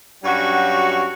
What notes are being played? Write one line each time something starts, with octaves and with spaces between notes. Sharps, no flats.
G2 F#3 C#4 F#4